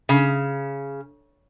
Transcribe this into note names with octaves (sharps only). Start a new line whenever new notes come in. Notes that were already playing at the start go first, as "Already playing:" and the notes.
C#3